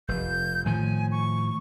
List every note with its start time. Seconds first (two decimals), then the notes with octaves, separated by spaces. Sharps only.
0.08 F1 G6
0.66 A2 D#3 F3 G#5
1.11 C#6